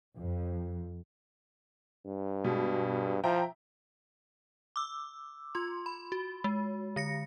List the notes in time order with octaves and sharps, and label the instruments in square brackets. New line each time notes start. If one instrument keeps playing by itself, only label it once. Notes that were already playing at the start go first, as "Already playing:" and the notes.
[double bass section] F2
[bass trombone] G2
[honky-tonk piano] B2 G#3
[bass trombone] F3 [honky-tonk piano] E4 G5 A#5
[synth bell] D6 E6
F4 C6
B5
F#4
G#3
D3 A#6 C#7